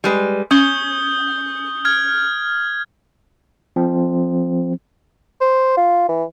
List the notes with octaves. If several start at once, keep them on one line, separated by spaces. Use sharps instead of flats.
G3 G#3 B4
C#4 D#6 G6 G7
F6 G#6
F3 C4
C5
F4
E3